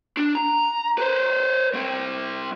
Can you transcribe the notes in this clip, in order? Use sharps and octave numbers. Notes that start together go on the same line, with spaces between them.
D4
A#5
B4 C5
G3 C4